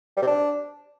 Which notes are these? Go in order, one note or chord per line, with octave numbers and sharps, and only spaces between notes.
G3
C3
D4